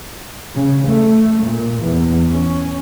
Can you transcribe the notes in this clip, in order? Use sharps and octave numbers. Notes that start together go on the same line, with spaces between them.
C#3
A3
A#2
E2
C#4